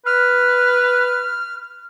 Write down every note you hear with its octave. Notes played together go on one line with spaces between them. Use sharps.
B4 F6